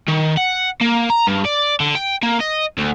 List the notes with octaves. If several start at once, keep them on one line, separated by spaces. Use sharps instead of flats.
D#3
F#5
A#3
A#5
G2
D5
D3
G5
A#3
D#5
D2